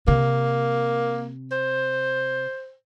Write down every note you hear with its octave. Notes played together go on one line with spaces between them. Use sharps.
C3 A#3
C5